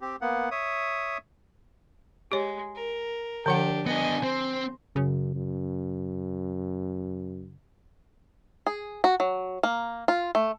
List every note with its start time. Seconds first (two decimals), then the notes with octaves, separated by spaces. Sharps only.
0.01 C4 G4
0.21 A#3 B3 F#5
0.51 C#5 E5 D#6
2.32 G#3 G4 C#5
2.76 A#4
3.46 D3 F3 D4 G4 F#5
3.87 B3 D4 D#5 G#5
4.24 C4 C5
4.96 F#2 C#3
5.36 F#2
8.67 G#4
9.04 F#4
9.20 F#3
9.63 A#3
10.08 F4
10.35 A3